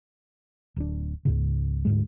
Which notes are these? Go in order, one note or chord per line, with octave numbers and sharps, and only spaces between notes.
D1 D4
C#2 G#2 C#3
D2 G#2 G#3